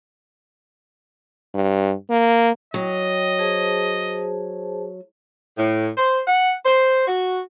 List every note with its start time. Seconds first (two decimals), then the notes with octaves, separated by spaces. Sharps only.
1.54 G2
2.10 A#3
2.74 F#3 D#5 G5
3.39 G#4 C5 A5
5.58 A2
5.98 C5
6.28 F#5
6.65 C5
7.07 F#4